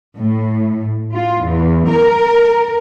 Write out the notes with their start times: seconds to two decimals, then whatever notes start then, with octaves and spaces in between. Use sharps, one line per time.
0.18 A2
1.14 F4
1.45 E2
1.90 A#4